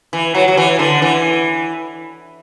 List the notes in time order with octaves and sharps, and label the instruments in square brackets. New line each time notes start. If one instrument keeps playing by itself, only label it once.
[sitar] E3
F#3
F#3
E3
D3
E3